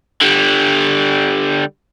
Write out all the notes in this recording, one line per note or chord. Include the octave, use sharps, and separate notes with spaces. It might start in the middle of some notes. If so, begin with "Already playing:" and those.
D3 G3